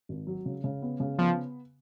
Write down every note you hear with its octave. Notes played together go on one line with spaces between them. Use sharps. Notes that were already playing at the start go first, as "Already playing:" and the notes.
G#1
F#3
C#3
C#3
B3
C#3
F3 B3